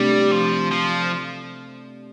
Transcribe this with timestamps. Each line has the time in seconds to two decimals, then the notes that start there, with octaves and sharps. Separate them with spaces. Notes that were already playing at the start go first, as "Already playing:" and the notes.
Already playing: C3 G3 A3 D4 G4
0.32 F3
0.72 F3